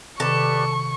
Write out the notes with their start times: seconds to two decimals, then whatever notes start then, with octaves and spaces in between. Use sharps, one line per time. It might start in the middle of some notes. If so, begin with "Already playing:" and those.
0.20 C3 D#3 G4 A4 B4 D5 C#6